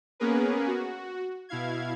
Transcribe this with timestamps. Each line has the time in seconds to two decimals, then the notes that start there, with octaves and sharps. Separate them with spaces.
0.20 A#3 B3 C#4 G#4 A#4 B4
0.67 F#4
1.49 B2 E4 F5 G#6